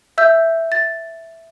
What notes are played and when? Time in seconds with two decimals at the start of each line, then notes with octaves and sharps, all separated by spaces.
0.18 E5 E6 G6
0.72 A6